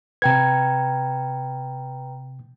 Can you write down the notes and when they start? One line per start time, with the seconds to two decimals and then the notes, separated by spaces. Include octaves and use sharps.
0.22 C3 B4 G5 A#5 G#6